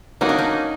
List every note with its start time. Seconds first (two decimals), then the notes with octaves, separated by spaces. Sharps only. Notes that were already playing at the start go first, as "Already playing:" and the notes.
0.21 A#3 C#4 D#4 F#4 A#4
0.29 D4
0.38 D#4